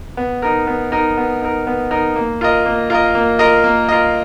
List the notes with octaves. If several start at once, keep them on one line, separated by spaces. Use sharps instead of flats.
B3
D#4 A#4
B3
D#4 A#4
B3
D#4 A#4
B3
D#4 A#4
A#3
F4 A#4 D#5
A#3
F4 A#4 D#5
A#3
F4 A#4 D#5
A#3
F4 A#4 D#5